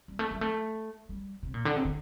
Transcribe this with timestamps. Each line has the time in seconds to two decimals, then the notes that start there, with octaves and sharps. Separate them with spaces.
0.08 G3
0.19 A3
0.31 G3
0.41 A3
1.09 G3
1.43 C3
1.54 A#2
1.65 D3
1.77 C3
1.85 D3